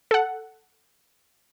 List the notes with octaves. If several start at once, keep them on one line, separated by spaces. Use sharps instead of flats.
A4 F#5